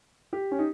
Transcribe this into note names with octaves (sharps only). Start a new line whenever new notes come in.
G4
C#4
D#4